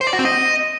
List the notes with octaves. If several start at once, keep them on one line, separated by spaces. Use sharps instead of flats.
C5
D5
F#4
C4
D#5